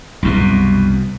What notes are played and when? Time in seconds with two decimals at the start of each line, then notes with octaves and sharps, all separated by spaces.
0.23 C2 F#2 B2